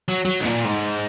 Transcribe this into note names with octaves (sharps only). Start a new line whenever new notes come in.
F#3
F#3
G#2
A#2
G#2